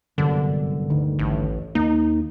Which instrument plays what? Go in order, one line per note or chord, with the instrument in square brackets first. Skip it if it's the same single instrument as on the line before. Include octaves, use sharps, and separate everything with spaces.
[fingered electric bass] G1 C2 F#2 [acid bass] D3
[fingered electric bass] G1 D2 D#3
[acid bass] A1
[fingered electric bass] D#2 A#3 [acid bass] D#4